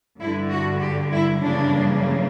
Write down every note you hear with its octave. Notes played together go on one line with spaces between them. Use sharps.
G2 D3 G3 E4
F#4
G4
E4
F#2 C#3 E3 G3 A#3 D4